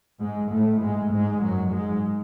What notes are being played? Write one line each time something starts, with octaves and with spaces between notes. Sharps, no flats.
G#2 G#3
A2 A3
G#2 G#3
G#2 G#3
F#2 F#3
G#2 G#3